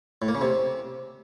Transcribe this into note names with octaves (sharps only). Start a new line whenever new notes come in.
A2
A#3
C#3
C3